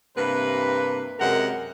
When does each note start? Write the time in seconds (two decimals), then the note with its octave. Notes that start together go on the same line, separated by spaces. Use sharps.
0.17 G2 C3 A#3 B4
1.20 F#2 C3 G#3 A#4 F#5